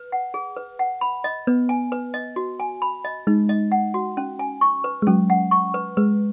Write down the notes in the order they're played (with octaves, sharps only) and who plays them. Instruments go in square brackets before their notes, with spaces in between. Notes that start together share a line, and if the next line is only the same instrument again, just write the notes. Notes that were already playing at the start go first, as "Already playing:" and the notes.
Already playing: [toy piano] B4
F#5
G#4
B4
F#5
B5
D#5
[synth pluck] B3 [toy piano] B4
[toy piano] G#5
B4
D#5
F#4
G#5
B5
D#5
[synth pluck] G#3 [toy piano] D#4
[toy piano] D#5
F#5
F#4
C#4
G#5
C#6
B4
[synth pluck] G#3
[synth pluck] F#3 [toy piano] C#4
[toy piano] F#5
C#6
B4
[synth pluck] G#3 [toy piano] B4